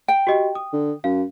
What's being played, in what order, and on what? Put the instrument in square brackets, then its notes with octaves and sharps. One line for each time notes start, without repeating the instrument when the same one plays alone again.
[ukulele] G5
[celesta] F#4 G4 D#5
D#6
[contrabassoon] D3
[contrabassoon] F#2 [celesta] F5